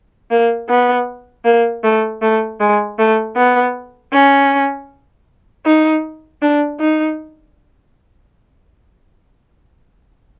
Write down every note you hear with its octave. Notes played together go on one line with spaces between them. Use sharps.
A#3
B3
A#3
A3
A3
G#3
A3
B3
C#4
D#4
D4
D#4